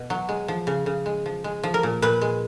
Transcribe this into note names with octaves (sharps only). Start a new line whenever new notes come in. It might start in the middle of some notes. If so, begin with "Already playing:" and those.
Already playing: B2
F#3
G#3
F3
C#3
C#3
G#3
F3
G#3
F3
A#4
A#2
A#2 B4
G#3